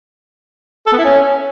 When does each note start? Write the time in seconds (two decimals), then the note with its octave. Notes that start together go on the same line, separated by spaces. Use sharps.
0.87 A4
0.93 B3
0.99 E4
1.05 C#4